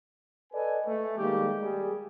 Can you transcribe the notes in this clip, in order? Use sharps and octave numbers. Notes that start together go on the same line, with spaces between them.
A4 B4 D5 D#5 G#5
A3
D#3 G3 G#3 A#3 G4
G3 G#4